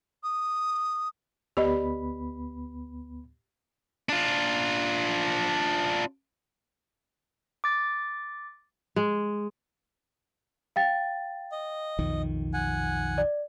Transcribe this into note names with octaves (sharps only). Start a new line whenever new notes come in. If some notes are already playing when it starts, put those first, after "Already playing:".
D#6
D2 B3 G4 D5 D#5 B5
D4 F4
D6 A6
G#3
F5 G5 A6
D#5
B1 F2 D#3
F#5 G#5
D5